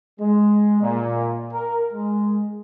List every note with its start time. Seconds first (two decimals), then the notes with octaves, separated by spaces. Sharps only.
0.20 G#3
0.82 A#2
1.53 A#4
1.93 G#3